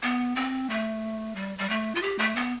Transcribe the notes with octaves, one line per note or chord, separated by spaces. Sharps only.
B3
C4
A3
G3
G3
A3
F4
G4
A3
B3